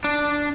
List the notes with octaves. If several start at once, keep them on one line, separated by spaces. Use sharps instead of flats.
D4